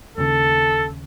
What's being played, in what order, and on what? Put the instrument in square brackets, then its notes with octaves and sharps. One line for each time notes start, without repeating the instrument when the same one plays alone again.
[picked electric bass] D#2 C#3 [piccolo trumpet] A4